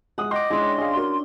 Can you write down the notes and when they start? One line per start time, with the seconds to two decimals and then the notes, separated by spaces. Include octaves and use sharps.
0.18 G#3 F#5 D#6
0.31 D#5 G5 C6 D6
0.50 G#3 C#4 D4 E4 C6
0.78 G#4 F5
0.95 F#4 A#4